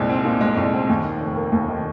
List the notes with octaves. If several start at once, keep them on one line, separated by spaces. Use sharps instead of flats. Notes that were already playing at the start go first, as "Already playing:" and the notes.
Already playing: C2 A#2 G#3
C4
A#2
G#3
C2
C4
D#2
D#3
F1
A#3
D#2
D#3